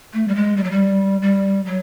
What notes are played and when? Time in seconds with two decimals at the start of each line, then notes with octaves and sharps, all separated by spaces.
0.14 A3
0.28 G3
0.35 G#3
0.57 G3
0.64 F#3
0.71 G3
1.22 G3
1.66 F#3